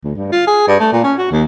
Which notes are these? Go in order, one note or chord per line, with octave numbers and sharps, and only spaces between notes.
D2
G2
F4
G#4
G2
A3
A#2
C#4
F#4
D#2